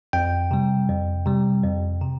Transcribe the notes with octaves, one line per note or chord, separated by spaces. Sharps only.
F2 G5
C3 G3
F2
C3 G3
F2
C3